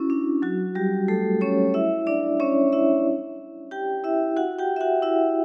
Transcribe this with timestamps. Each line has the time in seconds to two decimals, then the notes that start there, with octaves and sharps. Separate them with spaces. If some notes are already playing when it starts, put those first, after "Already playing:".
Already playing: C#4 E4 F#4
0.10 D4
0.42 F#3 F#4
0.75 G3 G4
1.08 A3 A4
1.41 C#4 C#5
1.74 E4 E5
2.07 D4 D5
2.40 C#4 C#5
2.72 E4 E5
3.71 G4 G5
4.04 E4 E5
4.37 F#4 F#5
4.59 G4 G5
4.76 E5
4.81 F#4 F#5
5.02 E4 E5